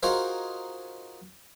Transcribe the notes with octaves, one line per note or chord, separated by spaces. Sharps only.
D#4 F4 F#4 G#4 A#4 C5